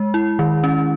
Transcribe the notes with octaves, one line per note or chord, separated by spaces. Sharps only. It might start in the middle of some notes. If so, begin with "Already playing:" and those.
Already playing: G#3
E4
D#3
C#4